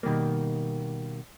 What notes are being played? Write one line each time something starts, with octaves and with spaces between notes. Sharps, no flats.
B2 D#3 G3 A#3